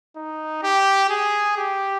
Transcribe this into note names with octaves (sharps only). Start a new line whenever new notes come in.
D#4
G4
G#4
G4